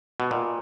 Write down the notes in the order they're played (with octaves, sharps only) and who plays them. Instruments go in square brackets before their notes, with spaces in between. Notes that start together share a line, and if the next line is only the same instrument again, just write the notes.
[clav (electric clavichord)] B2
A#2